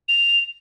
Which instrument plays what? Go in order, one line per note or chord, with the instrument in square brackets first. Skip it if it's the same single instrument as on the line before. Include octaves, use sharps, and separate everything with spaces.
[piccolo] F7